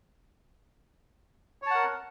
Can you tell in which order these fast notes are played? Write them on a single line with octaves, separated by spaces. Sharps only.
C#5 A5 F#5 A#4